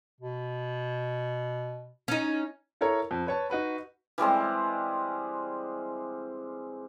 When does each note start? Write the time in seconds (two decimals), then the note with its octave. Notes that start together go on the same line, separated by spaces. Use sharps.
0.20 B2
2.08 C#4 D#4
2.81 E4 A4 A#4 C#5 A#5
3.11 F2
3.27 B4 C#5 A5
3.50 D#4 F#4 B4 B5
4.18 E3 G3 G#3 C4